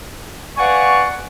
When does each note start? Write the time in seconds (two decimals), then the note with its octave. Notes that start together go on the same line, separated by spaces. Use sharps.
0.57 B4 D5 F5 F#5 G#5 C#6